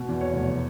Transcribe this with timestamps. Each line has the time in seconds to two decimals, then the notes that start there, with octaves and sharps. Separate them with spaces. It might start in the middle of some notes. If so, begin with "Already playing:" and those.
Already playing: B2
0.08 E2
0.21 C#5
0.34 F1